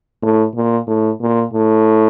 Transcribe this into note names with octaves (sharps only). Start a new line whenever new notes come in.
A2
A#2
A2
A#2
A2